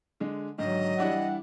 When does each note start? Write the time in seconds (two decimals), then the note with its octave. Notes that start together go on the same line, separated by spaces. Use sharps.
0.20 D3 G#3
0.58 G#2 D3 D#3 F#3 D#5
0.99 E3 G3 D4 E4 F#5